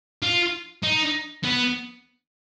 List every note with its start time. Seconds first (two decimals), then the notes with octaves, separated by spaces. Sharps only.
0.22 F4
0.83 D#4
1.44 B3